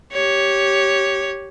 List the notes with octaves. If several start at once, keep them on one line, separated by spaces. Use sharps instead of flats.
G4 C#5